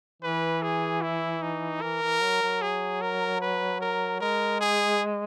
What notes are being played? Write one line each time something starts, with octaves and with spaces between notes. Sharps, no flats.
E3 B4
G#4
E4
D#4
E3 A#4
E3
F#3
F#3
G#4
A#4
B4
A#4
G#3 A#4
G#4